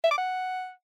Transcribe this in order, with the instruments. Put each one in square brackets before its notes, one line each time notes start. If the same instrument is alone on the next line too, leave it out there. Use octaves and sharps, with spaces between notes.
[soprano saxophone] E5
D6
F#5